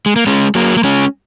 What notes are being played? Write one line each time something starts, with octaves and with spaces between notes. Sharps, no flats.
G#3
A#3
G#3 C#4
F#3 A#3
A#3
G#3 C#4